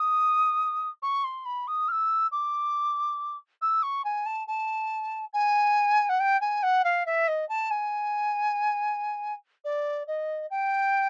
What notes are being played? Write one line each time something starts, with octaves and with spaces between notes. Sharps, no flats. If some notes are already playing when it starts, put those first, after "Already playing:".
Already playing: D#6
C#6
C6
B5
D#6
F6
E6
D6
E6
C#6
G#5
A5
A5
G#5
F#5
G5
G#5
F#5
F5
E5
D#5
A5
G#5
D5
D#5
G5